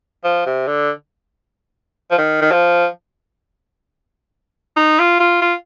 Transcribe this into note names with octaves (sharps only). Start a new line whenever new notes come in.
F3
C3
D3
F3
D#3
D#3
F3
D#4
F4
F4
F4